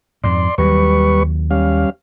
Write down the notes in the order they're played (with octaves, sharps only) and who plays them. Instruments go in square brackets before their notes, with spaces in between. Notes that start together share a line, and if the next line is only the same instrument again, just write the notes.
[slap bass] F2 G#2 [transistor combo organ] D5 C6
[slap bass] D#2 F#3 [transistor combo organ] G3 B4 C#6
[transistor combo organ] G3 C#4 F5